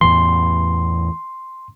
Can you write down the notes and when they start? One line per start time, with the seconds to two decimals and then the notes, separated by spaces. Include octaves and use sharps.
0.01 E2 A2 E3 C6